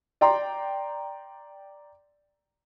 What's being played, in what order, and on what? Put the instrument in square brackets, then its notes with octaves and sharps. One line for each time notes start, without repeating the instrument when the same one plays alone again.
[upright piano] D5 G5 A#5 C6